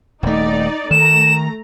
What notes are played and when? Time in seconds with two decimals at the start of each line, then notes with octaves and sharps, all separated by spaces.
0.23 D#1 A3 D#4 D5
0.91 D#3 A3 A#5 E7